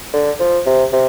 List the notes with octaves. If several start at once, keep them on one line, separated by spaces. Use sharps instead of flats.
D3
F3
C3
C3